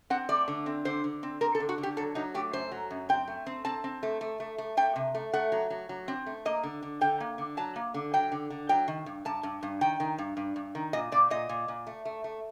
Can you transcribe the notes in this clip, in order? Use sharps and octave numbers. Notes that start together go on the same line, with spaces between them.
C4 F#5
A3 D5
D3
C4
D3 C5
D3
C4
C4 A#4
A4
D3
F#4
D3
G4
F#3 A4
F#3 D#4
A3 G4
F#2 C5
F#3
F#2
C4 G5
A3
C4
C4 A5
C4
A3
A3
A3
A3
A3 G5
C3
A3
A3 F#5
F#3
F#3
F#3
C4
A3
A#3 D#5
D3
D3
D3 G5
A#3
D3
F#3 A5
A#3
D3
F#3 G5
D3
D3
F#3 G5
D#3
G2
G2 A5
G2
G2
D#3 G5
D#3
G2
G2
G2
D#3
A#2 D#5
A#2 D5
A#2 D#5
A#2
A#2
A3
A3
A3